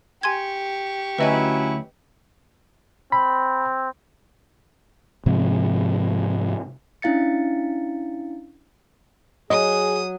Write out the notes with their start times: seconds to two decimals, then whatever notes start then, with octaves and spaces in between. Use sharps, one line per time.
0.23 G4 G#5 C6 C#6 G#6
1.18 D2 F#3 C#4 E4 B4 D#5 G#5
3.12 C4 B5
5.26 G#2 C3 F3
7.02 C#4 D4 E4 F5 A6 C#7
9.50 F#3 G#4 D#5 D#6